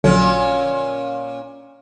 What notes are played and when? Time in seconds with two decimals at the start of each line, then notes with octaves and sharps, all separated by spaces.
0.04 A#1 A#2 D3 F#3 C#4